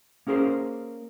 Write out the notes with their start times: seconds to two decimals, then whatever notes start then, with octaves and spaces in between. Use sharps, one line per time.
0.27 A#3 C#4 G#4 A#4 C5